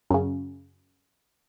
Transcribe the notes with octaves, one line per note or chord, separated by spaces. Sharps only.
F#2 C#3